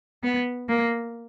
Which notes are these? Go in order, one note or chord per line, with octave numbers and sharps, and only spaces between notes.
B3
A#3